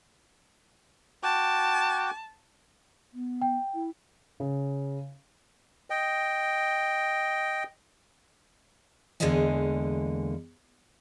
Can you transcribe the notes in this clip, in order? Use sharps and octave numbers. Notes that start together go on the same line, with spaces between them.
F#4 G5 A5 D6
B3
G5
E4
C#3
D#5 G5
E2 D3 G#3 A#3 D#5 G#5